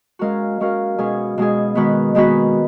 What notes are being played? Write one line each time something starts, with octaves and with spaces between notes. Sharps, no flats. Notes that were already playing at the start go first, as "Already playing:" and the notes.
G#3 C#4 F#4 A#4 F5
G#3 C#4 F#4 A#4 F5
B2 G#3 C#4 G#4
B2 G#3 C#4 G#4
D#3 G#3 B3 F#4 B4
D#3 G#3 B3 F#4 B4